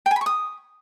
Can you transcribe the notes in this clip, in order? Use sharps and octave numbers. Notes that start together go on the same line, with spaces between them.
G5
G#5
B5
C#6
D#6